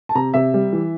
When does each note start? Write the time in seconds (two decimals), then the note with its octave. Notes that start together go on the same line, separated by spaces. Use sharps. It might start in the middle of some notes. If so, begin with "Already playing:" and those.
0.09 A5
0.15 C3 A#5
0.34 C3 E5
0.54 G3
0.73 E3